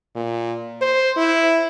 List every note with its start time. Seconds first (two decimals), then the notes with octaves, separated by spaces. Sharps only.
0.15 A#2
0.82 C5
1.17 E4